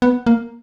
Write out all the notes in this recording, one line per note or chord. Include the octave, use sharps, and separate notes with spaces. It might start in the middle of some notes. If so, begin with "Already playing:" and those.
B3
A#3